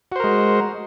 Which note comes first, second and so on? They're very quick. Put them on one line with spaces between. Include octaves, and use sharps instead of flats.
F#4 C5 A#4 G#3